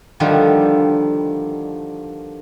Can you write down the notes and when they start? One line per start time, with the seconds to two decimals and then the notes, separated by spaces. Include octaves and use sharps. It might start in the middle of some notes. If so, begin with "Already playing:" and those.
0.20 D3 D#3 F3 G3